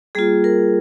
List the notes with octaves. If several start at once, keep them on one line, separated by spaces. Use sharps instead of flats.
G3 A#3 F4 G#4
A#4